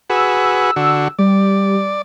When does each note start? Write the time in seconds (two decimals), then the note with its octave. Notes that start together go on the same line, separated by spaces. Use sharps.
0.10 F#4 G#4 B4 E6
0.76 D3 F#4
1.19 G3 D5